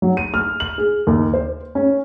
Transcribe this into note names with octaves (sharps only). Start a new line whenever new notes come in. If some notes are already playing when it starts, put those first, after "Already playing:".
F#3
D#7
F6
F#7
G#4
D#2
C5
C#4